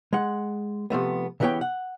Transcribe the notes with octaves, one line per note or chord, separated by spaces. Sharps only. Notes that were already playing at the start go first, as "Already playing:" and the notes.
G#3 F#5
C3 F3 A3 B3
C#3 E3 B3 G4 C#5 G5
F#5